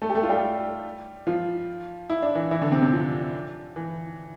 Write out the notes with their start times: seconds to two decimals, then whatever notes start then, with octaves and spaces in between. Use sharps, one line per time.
0.02 A3 A4
0.10 G4
0.15 A3 A4
0.23 F4
0.29 G3 G4
1.27 F3 F4
2.10 E4
2.22 D4
2.35 E3 E4
2.51 E3 E4
2.62 D3 D4
2.72 C3 C4
2.82 C3 C4
2.93 F3
3.76 E3